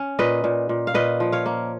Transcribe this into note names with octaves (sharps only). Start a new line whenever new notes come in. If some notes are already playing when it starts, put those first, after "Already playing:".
Already playing: C#4
A#2 B4 D#5
A#2
A#2
F5
A#2 B4 D#5
F3
C#5 F5
A#3